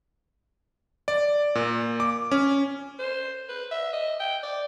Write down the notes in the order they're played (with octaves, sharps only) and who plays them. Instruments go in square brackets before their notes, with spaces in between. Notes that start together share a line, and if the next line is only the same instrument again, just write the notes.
[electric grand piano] D5
A#2
D6
C#4
[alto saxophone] C5
B4
E5
D#5
G5
D5